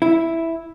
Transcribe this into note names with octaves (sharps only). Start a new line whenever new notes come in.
E4